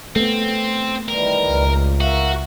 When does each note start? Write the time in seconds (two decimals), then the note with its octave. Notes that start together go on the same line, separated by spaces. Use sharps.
0.16 A3 B3 C4
1.08 D#3 E3 G3 A#4
1.47 C#2
2.01 F#4 A#4 E5 F5